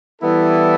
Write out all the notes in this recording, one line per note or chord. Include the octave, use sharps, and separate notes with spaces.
E3 G3 B3 E4 A4